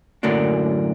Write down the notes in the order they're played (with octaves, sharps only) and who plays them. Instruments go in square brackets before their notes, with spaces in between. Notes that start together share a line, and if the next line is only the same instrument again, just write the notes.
[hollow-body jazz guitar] F#2 A2 D3 F#3 A#3 D4